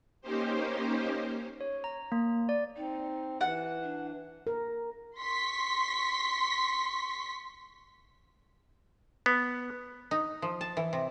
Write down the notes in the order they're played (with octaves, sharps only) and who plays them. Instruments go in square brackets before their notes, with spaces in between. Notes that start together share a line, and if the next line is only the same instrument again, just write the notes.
[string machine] A#3 C#4 D#4 G4 C5
[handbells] C#5
A#5
A#3
D5
[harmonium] C4 [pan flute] D#4
[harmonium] E3 [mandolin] F#5
[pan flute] D4
[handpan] A#4
[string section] C6 C#6 B6
[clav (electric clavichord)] B3
[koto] D#4
F3
A5
E3
C3